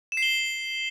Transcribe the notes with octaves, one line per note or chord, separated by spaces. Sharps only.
E7
C7
G7